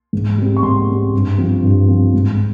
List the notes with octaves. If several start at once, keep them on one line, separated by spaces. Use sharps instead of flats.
G#2
G3 C4
C#6
G#2 C6
G3 C4
G2
F3 C4
G2
F3 C4
G#2